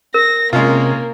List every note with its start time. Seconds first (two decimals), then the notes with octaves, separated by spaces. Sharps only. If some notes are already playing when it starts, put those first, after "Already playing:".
0.14 A#4 A#6
0.53 C3 G#3 A#3 C#4 F4